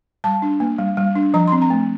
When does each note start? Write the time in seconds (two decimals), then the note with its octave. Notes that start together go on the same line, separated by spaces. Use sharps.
0.24 G3 A5
0.42 D4
0.60 A#3
0.78 G3
0.97 G3
1.15 D4
1.34 F3 A#5
1.48 C4 C6
1.62 A#5
1.70 A3